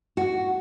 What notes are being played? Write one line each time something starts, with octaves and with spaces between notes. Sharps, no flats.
F#4